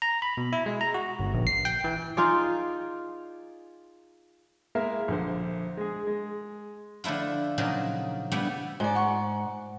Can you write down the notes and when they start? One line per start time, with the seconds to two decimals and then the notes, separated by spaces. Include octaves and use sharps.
0.02 A#5
0.22 B5
0.37 B2
0.53 E4
0.66 G#3
0.81 A#5
0.94 F#4
1.19 G1
1.34 A#1
1.47 C7
1.65 G5
1.84 E3
2.17 D#4 F4 G#4 D5
4.75 G#3 A#3 E4 A#4 E5 F5
5.08 A#1 D3 C5
5.77 G#3 G#4
6.07 G#3
7.04 D3 F3 A3 E4 F4
7.58 A#2 C#3 F3 F#3 D#4 A#4
8.32 G3 A3 B3 D4 E4
8.80 G#2 G#4 D5
8.95 F#5 C#6